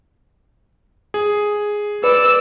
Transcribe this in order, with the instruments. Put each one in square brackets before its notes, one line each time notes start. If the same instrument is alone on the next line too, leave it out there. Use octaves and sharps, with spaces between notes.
[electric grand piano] G#4
[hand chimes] B4 [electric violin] D5 E6